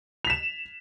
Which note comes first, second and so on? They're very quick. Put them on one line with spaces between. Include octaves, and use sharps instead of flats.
F7 B6 E7